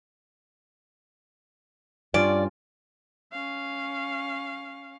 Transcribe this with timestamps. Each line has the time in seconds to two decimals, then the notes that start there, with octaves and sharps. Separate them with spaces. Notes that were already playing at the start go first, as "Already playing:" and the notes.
2.14 G2 C#4 F4 D5
3.32 C#4 F5